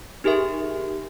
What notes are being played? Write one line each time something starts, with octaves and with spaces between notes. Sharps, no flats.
D#4 G4 G#4 A#4 E5